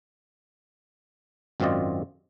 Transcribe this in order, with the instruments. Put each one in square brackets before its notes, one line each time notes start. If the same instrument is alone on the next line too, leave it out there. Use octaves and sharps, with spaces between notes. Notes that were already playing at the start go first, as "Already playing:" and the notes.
[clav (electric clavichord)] G#1 F#2 C4 F4 D5 D#5